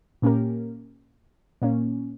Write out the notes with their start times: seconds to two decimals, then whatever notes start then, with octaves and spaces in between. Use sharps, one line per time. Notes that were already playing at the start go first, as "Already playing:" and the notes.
0.22 A#2 A#3 C#4 G4 A#4
1.62 A#2 A#3 C#4